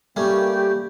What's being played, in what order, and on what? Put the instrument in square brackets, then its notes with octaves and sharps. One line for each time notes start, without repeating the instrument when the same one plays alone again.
[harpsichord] G3 A3 C#4 [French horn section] A#3 [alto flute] G4